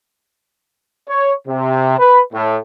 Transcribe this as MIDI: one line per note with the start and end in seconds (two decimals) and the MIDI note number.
1.08 1.32 73
1.47 1.94 48
1.98 2.19 71
2.33 2.56 45